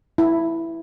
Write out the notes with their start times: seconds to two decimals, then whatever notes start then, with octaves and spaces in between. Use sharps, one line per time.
0.18 E4